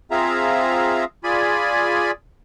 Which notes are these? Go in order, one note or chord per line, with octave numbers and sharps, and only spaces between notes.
C4 F4 G#4 E5 F5 A#5
F4 G#4 D5 G#5 B5